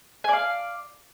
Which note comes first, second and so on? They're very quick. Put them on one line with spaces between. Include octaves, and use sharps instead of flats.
G#5 D5 F5